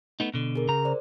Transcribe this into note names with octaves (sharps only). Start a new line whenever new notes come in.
A3 B3 D#4
B2 D3
G#4 A#4
C#3 A#5
C5 D5